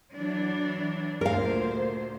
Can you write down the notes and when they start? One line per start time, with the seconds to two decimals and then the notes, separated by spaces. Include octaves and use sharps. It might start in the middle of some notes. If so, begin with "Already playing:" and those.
0.13 E3 F#3 D4
1.21 D2 A#2 A#4 C5 F5